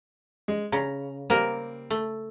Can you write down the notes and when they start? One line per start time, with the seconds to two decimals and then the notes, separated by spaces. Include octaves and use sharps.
0.48 G#3
0.72 C#3 A#5
1.30 G3 A#3 C4 A#4
1.90 A3